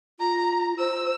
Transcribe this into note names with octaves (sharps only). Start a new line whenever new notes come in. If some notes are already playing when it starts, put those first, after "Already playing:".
F4 A#5
C5 E6